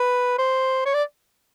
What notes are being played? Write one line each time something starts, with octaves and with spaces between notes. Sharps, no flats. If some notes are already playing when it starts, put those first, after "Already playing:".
Already playing: B4
C5
C#5
D5